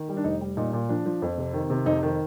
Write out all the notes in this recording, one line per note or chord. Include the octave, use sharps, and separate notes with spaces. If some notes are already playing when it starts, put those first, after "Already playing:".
Already playing: D#3
G3
D4
F1 D#4
G3
A#2 D#4
A#2
F3 D4
F3
F2
C3
D#3
C3
F2 D#4
D#3